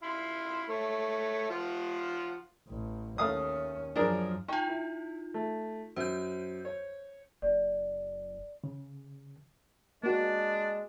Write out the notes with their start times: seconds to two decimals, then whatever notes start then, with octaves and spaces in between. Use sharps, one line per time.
0.03 E4 F5 C6
0.69 A3 C#5
1.50 F3 F4 F#5
2.67 A1
3.18 D#2 A3 C#4 F5 D#6
3.96 F#2 F3 D4 G#4 A#4
4.48 D#4 F4 G5 G#5 C#6
4.68 E4
5.34 A3
5.96 F#2 C5 G6
6.65 C#5
7.42 F#1 D5
8.64 C#3
10.03 G#3 A#3 D4 F#4